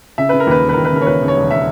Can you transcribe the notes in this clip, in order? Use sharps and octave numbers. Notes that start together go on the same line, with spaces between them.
C#3 E5
C#3 B4
A#4
D#2 B4
E1
B4
D#2 A#4
B4
C#3 A#4
C#5
D#2 B4
C#3
C#5
E1
E5